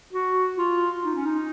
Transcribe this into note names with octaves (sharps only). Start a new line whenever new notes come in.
F#4
F4
D#4
C#4
D#4